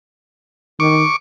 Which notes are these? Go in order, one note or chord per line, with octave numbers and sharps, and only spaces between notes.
D#3 C#6 D6